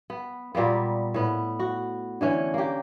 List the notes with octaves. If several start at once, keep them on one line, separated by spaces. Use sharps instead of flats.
B3
A#2 G3 A#3 B3
A2 B3
F#4
D3 E3 C#4
A#3 G4